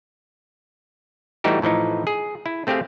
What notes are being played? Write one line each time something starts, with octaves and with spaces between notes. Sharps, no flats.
E3 G3 A3 D#4 F#4 G4
A2 E3 F3 D#4
G#4
E4
A3 C4 G4 G#4 F5